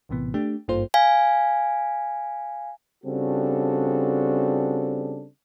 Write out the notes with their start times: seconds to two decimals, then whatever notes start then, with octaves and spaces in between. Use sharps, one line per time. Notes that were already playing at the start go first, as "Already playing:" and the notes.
0.09 A#1 A2 C3 E3 B3
0.34 A3 D4 G4
0.68 G#1 G2 A#3 F4 A4 C5
0.94 F5 G#5
3.04 C#3 G3 C4 D4 F#4 A4